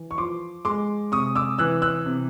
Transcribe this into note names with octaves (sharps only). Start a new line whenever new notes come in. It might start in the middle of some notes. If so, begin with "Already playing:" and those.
Already playing: E3
C#6
F3 C6 D6
G#3 C6 D6
C3 C#6 D#6
D6 E6
E3 E6 F#6
E6 F#6
C3